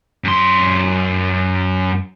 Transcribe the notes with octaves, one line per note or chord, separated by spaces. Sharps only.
F#2 C6